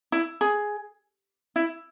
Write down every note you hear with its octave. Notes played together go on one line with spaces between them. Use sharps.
E4
G#4
E4